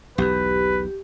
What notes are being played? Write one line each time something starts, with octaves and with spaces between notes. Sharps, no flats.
B1 E2 G4 B4